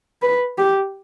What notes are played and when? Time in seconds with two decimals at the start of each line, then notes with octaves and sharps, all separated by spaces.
0.22 B4
0.58 G4